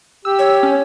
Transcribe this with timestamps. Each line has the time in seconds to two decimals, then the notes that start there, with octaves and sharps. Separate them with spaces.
0.25 G4 E6
0.39 C#5
0.63 C#4